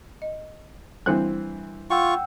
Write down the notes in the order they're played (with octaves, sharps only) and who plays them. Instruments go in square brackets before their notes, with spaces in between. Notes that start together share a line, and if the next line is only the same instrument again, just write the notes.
[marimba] D#5
[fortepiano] E3 C4 F#6 [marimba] G3 D4 E4
[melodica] F4 C#6 [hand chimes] F#5 G5 E6